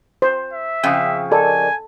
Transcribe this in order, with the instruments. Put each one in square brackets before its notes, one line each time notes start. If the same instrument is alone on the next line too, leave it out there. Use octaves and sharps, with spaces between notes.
[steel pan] C5
[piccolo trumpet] E5
[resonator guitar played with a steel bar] F2 C#3 [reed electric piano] G5 D#6
[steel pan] A4 [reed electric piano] A#4 D5 D#5 [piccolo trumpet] G#5